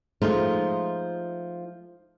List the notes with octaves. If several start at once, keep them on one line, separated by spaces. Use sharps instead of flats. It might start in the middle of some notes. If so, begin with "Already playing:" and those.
F3 G#3 A3 D#4 F4